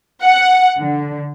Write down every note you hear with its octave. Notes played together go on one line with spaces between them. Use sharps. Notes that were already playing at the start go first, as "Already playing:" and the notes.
F#5
D3